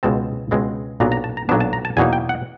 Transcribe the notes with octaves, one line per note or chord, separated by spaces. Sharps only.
C#2 B2 G#3 C4 A5
C#2 B2 G#3 C4
B1 A#2 F#3 B3 D4 A#5
A#5
A5
A#5
B1 A#2 F#3 B3 D4 A5
A5
A#5
A5
E2 B2 F#3 A#3 D#4 G#5
G5
F#5